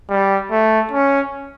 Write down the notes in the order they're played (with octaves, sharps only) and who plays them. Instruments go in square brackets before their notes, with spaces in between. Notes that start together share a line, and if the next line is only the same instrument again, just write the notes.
[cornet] G3
A3
C#4